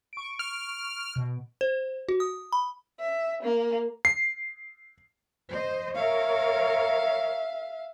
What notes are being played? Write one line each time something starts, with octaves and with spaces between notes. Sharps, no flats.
C#6 D7
F6
B2
C5
F#4
D#6
B5
E5
A#3
C7
C5 D#5
A#4 C#5 E5 F5